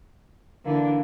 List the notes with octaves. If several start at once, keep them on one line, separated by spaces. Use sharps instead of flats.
D3 E3 A#3 D4